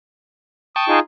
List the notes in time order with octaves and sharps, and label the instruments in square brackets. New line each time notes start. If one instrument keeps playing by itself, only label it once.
[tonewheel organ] G5 A5 C#6 [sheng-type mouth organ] D#6
[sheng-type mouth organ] D#4 F4 G#4